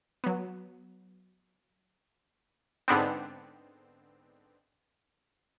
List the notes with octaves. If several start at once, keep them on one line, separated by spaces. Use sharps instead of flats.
F#3 B3
G#2 D3 B3 C4